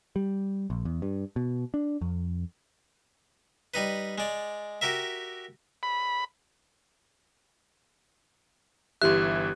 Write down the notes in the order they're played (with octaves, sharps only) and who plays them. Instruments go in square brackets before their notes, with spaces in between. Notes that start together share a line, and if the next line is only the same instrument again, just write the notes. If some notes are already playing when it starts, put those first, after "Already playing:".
[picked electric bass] G3
A#1
E2
G2
B2
D4
F2
[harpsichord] G3 D#4 B4
G#3 D5
F#4 G4 A#4 E5
[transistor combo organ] B5
[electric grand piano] G1 E3 E5 [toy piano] G4 C6 [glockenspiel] F#6